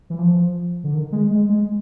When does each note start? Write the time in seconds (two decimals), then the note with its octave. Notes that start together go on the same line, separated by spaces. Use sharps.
0.10 E3
0.19 F3
0.84 D3
0.94 D#3
1.12 G#3
1.31 G#3
1.49 G#3